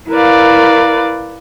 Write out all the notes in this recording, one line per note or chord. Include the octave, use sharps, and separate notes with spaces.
E4 A#4 B4 D5 F5